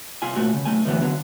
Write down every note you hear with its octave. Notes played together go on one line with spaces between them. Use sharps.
C2 F4 G#5
A#2 A3 F#4
C#3
B1 A3 G#5
F#2 A2 D3 E3 F#3 B3
D3 F#3